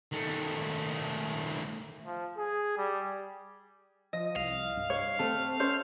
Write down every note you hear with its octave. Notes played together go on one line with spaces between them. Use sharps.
D#3 A3
F3
G#4
G3
F3 D#5
C2 F5
G2
C#5
A3 C4 A4
C#4 A4 C5 C#5